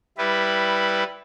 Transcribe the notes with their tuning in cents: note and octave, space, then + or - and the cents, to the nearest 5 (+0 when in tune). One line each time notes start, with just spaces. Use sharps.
G3 +0 E4 +0 B4 +0